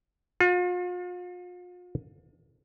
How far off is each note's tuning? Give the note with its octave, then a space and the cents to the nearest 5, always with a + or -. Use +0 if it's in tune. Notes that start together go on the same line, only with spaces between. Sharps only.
F4 +40